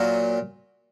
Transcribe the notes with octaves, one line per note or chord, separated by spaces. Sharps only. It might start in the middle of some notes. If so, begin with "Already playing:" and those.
Already playing: A#2 F#3